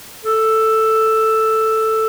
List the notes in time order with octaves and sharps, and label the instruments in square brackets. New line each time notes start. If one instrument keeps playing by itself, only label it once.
[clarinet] A4